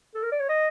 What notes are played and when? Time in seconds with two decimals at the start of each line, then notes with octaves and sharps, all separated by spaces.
0.15 A4
0.23 A#4
0.32 D5
0.40 C#5
0.49 D#5